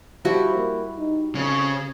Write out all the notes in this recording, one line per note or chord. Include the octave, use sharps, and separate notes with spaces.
F3 G3 E4 F#4
A#3
D#4
F2 C#3